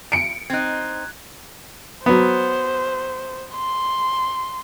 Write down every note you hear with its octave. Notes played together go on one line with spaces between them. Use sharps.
C#7 D7
C4 D#4 F#6 G#6
F#3 B3 C5
C6